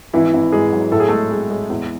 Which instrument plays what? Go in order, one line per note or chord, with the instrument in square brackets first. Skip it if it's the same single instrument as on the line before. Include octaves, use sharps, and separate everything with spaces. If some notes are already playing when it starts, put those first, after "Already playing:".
[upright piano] G#1 E3 E4
G#1
G#2 G#3 G#4
F#3
A2 A4
G#4
G#3 A3 A4
G#3
G#3
E2